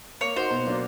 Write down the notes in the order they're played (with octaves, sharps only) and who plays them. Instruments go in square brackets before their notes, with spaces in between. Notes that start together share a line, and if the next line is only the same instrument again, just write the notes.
[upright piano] A#3 [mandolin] C#5
[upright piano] D#4 F#4 [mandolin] C5
[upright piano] B2
F#3 A#3 D4